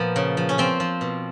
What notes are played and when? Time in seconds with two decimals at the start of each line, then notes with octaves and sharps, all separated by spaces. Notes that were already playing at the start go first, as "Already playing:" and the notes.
Already playing: A#2 F3 B3
0.16 C#3
0.37 F3
0.49 C#4
0.58 F3 C4
0.80 F3
1.01 B2